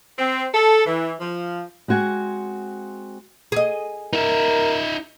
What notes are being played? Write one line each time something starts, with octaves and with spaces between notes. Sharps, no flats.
C4
A4
E3
F3
G#3 C4 F#4 G#5
G#4 D#5
D#4 A#4 E5